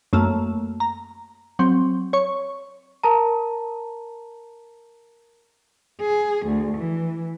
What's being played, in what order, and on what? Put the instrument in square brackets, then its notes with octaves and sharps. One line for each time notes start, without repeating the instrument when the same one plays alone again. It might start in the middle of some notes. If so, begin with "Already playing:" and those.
[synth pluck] F#2 A3 A#3
A#5
F#3 C4
C#5 C#6
[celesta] A#4 A5 A#5
[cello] G#4
D2
E3